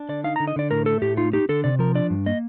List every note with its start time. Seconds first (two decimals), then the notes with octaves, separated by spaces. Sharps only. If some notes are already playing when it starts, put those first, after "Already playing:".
Already playing: D4
0.09 D3 D5
0.24 D#4 F5
0.36 A#5
0.40 D3
0.47 D#5
0.56 D3 D5
0.71 A2 A#4
0.86 A3 A4
1.02 A2 G4
1.17 D#4 F4
1.33 D#4 G4
1.49 D3 A4
1.64 C3 D5
1.79 F3 A#4
1.95 D4 D5
2.10 G2
2.26 A#3 D#5